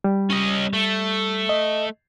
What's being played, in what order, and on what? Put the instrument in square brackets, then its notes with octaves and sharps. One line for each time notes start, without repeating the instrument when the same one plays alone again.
[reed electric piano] G3
[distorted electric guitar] C#4 D#5
A3
[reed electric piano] D#5